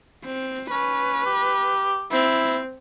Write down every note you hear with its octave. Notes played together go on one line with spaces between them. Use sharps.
C4
C#4 B4
G4
C4 E4